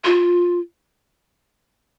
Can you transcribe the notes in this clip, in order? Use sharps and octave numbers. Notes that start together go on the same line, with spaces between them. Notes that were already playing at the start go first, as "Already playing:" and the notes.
F4